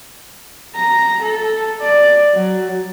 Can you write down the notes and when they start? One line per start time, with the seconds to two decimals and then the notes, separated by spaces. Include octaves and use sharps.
0.75 A#5
1.22 A4
1.80 D5
2.33 F#3